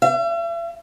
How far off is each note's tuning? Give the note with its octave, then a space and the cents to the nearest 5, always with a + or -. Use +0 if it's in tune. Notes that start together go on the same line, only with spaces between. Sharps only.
E5 +45